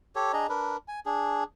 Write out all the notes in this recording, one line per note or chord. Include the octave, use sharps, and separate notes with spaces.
G4 A4 C#5
D4 G#4 D#5 A#5
D4 A#4 B4
G#5
D4 G#4